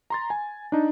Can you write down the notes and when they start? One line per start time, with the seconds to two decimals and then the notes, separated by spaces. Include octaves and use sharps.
0.10 A#5 C6 A6
0.30 G#5
0.72 D4 D#4